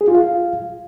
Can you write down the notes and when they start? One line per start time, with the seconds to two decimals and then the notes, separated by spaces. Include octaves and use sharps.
0.01 G#4
0.08 F4
0.15 F5